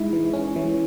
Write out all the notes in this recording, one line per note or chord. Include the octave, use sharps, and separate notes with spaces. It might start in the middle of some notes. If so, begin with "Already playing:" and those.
Already playing: G#3 D#4 E4
E3
C#4
E3